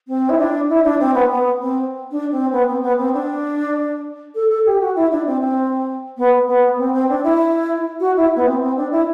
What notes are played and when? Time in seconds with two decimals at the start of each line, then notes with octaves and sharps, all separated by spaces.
0.08 C4
0.29 E4
0.39 D4
0.69 E4
0.84 D4
1.00 C4
1.14 B3
1.31 B3
1.61 C4
2.11 D4
2.32 C4
2.52 B3
2.68 C4
2.82 B3
2.98 C4
3.13 D4
4.35 A4
4.50 A4
4.66 G4
4.80 F#4
4.96 E4
5.12 D4
5.26 C4
5.41 C4
6.18 B3
6.48 B3
6.78 C4
6.93 C4
7.09 D4
7.24 E4
8.00 F#4
8.16 E4
8.36 B3
8.46 C4
8.61 C4
8.77 D4
8.92 E4